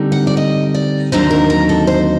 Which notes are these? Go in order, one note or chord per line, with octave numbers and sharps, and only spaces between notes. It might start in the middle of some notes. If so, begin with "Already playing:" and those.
Already playing: D3 G3 C4 D#4
F#5
D5
D#5
D5
D#2 D3 F#3 C4 D#4 C5
A#4
A#4
A4
C5